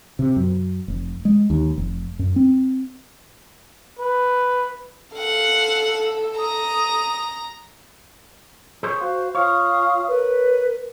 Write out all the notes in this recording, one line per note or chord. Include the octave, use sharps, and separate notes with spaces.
C3
F#2
F1
G#3
D#2
F1
F#2
C4
B4
A4 F5 F#5
A#5 D#6
G#4 C5 C#5
F#4 C5 F5
F4 C#5 F5 D#6 F6
A#4 B4